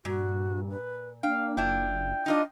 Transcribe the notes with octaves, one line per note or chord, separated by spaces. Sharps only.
G2 A#2 F#4
B4
A#3 D4 F5 G5
F#1 D4 E4 F4 G5
D4 D#4 F4 D#5